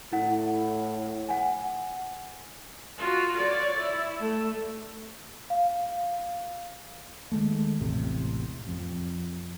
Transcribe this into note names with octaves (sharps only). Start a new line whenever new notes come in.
A2 E4 F#5
F#5 G#5
F4 F#4
C#5 D5
E4
A3
F5
D#3 E3 G#3 A3
A1 E2 A2 C3
F2